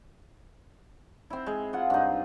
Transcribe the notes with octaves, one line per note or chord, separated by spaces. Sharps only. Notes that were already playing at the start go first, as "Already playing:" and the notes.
C4 E4
G#3
F4 F#5
G2 D#4